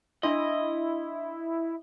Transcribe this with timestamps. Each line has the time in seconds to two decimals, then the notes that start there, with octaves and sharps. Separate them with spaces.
0.23 D4 E4 D#5 C6